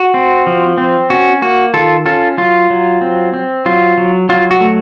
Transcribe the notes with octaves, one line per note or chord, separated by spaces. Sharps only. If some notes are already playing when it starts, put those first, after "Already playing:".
Already playing: F#4
C4
F3
C4
C#4 F#4
A#3 F#4
D#3 F4 A4
C#4 F4 A4
F#3 F4
F#3
C4
C4
F#3 F4
F#3
F#3 F4
F#4
A3